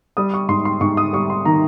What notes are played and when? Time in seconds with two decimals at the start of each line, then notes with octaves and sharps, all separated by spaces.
0.17 G3 D#6
0.34 C#6
0.48 G#2 C6
0.65 C6
0.81 G#2 C#6
0.97 D#6
1.13 G3 C#6
1.30 C6
1.45 D#3 A#5